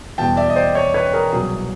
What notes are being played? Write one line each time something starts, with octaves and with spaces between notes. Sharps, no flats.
E2 B2 G3 B3 G5 A5
D5 E5
D#5
C5 D5
C#5 D#5
B4 C#5
G#4 A#4
C2 B2 F#3 G#4